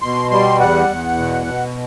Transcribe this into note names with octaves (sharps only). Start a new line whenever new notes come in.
B2 C6
G3 C6
E2 F#5
E2
B2
B2